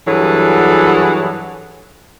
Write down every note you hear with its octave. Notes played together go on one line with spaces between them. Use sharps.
G2 E3 F#3 G#4 A4 F#5